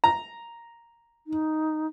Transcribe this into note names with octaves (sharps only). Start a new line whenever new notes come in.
A#5
D#4